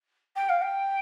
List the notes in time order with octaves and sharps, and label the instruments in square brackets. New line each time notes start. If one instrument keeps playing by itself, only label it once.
[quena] G5
F5
G5